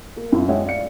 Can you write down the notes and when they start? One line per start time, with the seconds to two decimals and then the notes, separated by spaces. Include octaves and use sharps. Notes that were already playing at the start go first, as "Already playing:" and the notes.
0.16 A#3
0.32 F#2 E4 F4
0.49 G#3 C#5 E5 F#5 G5
0.65 D5 F5 C#7